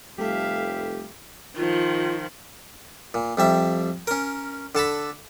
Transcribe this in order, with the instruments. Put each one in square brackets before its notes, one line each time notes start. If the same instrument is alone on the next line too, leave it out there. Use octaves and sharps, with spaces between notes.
[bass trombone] F1 [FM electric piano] G3 A3 A4 [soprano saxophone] G4 [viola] E5 F5
[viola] D#3 F3 [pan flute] F4
[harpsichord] A#2
F2 G3 E5
C#4 A#4
D3 A4 A5 B5